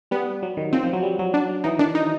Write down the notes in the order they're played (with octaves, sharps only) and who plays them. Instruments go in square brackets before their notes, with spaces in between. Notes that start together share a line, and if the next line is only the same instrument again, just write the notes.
[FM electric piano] G3 [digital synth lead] B3
[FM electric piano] F#3
D#3
[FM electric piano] F3 [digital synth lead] C4
[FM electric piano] F3
F#3
G3
F#3
[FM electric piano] F#3 [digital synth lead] D4
[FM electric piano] E3 [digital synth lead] D#4
[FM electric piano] D#3 [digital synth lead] D4
[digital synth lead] D#4